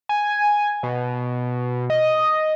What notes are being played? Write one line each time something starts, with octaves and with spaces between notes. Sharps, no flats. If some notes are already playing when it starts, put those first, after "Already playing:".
G#5
B2
D#5